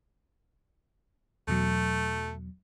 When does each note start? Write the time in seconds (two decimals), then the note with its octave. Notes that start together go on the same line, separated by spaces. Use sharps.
1.48 E2 B2 F#3 A3